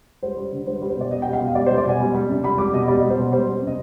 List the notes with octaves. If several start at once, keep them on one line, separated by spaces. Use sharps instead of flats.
G3 C5
G3
D3
G3 C5
B4
G3
C5
B2 D5
G3 D#5
G5
G3
F5
B2 D#5
G3 D5
C5
G3
D5
B2 G#5
G3
G3
C3
G3 B5
G3 D6
B2 D#5
G3 D5
G3
C5
B2
G3 C5
G3
C3
D#5